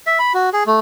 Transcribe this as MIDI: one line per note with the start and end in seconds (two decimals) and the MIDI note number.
0.07 0.19 76
0.19 0.33 83
0.34 0.50 66
0.53 0.64 68
0.66 0.80 57